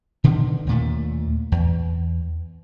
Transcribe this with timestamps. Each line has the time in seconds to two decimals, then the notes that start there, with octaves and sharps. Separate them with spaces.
0.24 B2 D3 D#3
0.67 D#2 A#2 A3
1.52 E2